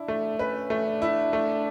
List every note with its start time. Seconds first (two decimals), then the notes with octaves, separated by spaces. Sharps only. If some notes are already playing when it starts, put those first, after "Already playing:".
Already playing: D4 E4
0.08 A3
0.39 C#4 B4
0.70 A3
0.86 D4
1.02 E4
1.33 A3